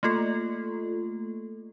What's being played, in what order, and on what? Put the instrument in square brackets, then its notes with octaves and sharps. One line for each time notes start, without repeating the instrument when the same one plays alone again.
[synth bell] A3 A#3 F4 A4